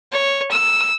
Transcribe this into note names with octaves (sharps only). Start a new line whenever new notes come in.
C#5
E6